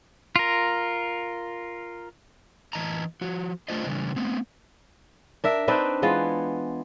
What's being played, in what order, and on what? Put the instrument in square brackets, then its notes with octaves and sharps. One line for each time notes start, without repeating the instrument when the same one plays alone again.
[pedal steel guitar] F4 A#4
[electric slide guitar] E3 D#5 A5 A#5
F3 F#4
A3 D4 F4 C5 D#5
C#3 E3 G3 D4
A3 B3 C4
[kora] D4 A#4 E5
C4 D4 D#4 B4
E3 G#3 B3 F4